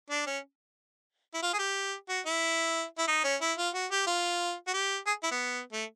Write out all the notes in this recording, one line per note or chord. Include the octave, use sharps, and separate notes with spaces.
D4
C#4
E4
F4
G#4
G4
F#4
E4
E4
D#4
C#4
E4
F4
F#4
G4
F4
F#4
G4
G#4
E4
B3
A3